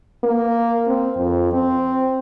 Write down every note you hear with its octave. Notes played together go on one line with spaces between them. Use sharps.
A#3
C4
F2
C4